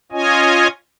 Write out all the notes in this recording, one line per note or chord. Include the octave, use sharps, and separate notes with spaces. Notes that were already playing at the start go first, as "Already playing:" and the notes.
C#4 F4 C#5 D#5 G#5